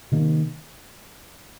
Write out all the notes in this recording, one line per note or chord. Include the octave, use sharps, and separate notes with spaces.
C3 D#3 A#3